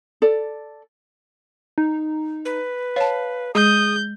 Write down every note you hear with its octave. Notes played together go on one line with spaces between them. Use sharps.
A4 D5
D#4
B4
C#5 F5 A5
G#3 G#4 D#6 G6